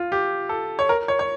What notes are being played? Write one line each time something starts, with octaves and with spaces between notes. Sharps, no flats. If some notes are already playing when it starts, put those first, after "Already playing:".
Already playing: F4
G4
A4
C#5
A#4
C#5
C#5